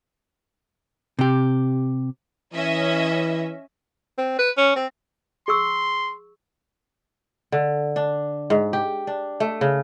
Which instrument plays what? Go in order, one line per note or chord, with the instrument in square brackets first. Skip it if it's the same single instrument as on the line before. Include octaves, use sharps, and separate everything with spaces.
[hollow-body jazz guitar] C3 G4
[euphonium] E3 [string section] C#4 D#5 E5
[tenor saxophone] C4
B4
C#4
C4
[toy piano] G#4 C#6 E6 [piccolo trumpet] C6
[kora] D3
D4
G#2
G4
D4
A3
C#3